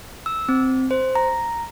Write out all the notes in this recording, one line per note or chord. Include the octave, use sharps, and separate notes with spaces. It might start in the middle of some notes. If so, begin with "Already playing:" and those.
E6
C4
C5
A#5